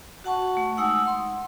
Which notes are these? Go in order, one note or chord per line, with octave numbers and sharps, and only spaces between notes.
F#4 F#5 A5 C#6
A3
G#3 D#4 F#5 D#6 E6
C6